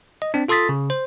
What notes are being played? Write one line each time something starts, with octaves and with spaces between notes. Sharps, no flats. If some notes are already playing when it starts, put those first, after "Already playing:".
D#5
C4 D4
F4 A4 C6 D#6 A6 B6
C#3
C5